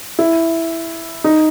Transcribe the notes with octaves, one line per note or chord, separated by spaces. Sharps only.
E4
D#4